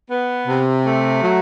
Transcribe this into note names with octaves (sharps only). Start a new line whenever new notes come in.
B3
C3
A3
F#3